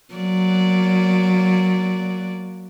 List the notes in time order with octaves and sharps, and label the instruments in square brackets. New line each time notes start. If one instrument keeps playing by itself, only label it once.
[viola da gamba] F#3 A#3 D5